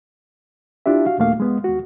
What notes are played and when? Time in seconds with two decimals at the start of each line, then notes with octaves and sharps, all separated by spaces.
0.86 D4 E4 F4 G4 E5
1.05 F#4 F5
1.19 D#2 A#2 A3 A#3 F5
1.40 G#3 B3
1.64 D#2 F#4